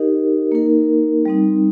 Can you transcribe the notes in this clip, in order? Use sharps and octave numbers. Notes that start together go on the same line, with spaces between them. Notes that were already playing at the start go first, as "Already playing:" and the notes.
Already playing: D#4 G4 A#4 D#5
A#3 D#4 A#4
G3 C4 D#4